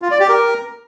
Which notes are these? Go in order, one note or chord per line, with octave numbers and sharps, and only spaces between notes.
F4
D5
G4
A#4